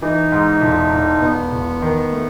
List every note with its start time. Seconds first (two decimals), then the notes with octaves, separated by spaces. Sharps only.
0.02 E3 D#4
0.32 G#2
0.62 E1
0.92 E1
1.22 E1 B3
1.52 E1
1.82 D#3
2.12 A3